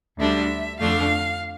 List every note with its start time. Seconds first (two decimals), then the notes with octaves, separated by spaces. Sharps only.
0.17 D2 D3 G3 D4 E5
0.79 F2 D3 A3 D4 F5